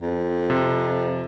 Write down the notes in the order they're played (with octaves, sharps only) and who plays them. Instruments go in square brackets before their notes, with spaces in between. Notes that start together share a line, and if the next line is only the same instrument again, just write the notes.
[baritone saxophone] F2
[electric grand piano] C3